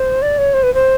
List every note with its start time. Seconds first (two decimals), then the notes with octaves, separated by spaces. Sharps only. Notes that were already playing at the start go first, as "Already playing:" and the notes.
Already playing: C5
0.22 D5
0.38 C#5
0.54 C5
0.63 B4
0.74 C5